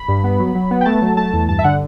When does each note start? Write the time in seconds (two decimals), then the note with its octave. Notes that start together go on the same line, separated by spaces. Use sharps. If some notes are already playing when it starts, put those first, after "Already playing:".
Already playing: B5
0.08 G2
0.24 B3
0.39 F#3
0.55 F#3
0.71 B3
0.81 G5
0.85 A3 A5
1.02 F#3
1.17 A3 A5
1.33 E2
1.49 G2 A5
1.59 E5
1.64 D3 F#5